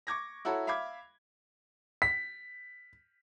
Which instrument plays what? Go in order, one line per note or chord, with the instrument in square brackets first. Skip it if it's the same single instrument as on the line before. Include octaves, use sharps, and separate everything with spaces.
[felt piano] C#6 D6 G#6 A#6
E4 F#4 A4 C#5 A#5
E5 F5 B5 D6 G#6
[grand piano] B6